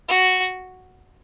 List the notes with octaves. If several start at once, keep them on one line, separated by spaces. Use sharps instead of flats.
F#4